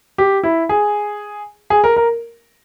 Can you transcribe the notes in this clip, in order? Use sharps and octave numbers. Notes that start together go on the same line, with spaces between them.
G4
E4
G#4
G#4
A#4
A#4